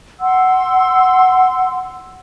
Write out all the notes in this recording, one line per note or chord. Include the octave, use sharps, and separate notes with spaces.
F#5 C6 E6